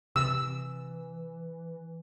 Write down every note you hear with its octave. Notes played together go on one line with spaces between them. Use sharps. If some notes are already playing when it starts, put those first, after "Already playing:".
C3 E3 E6